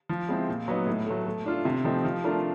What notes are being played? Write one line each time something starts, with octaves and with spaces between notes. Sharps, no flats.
F3
G#3 C4 E4
A#2
F#3 B3 D#4
A2
F#3 A3
A3
D4 F4 A4
C3
F3 A3 C4 D#4
F3
A3 D4 F4 A#4